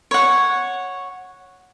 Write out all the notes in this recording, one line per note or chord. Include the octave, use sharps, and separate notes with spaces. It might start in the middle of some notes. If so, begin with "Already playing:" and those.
C#5 F#5